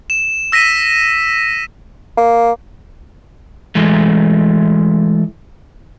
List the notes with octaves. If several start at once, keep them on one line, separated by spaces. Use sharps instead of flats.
E7
E6 A#6 B6 D#7
A#3
E3 G#3 A3